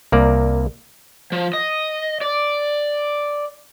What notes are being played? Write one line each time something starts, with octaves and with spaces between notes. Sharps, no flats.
C2 A#3 D5
F3
D#5
D5